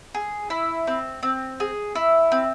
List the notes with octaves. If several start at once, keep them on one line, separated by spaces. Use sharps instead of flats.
G#4
E4
C4
C4
G#4
E4
C4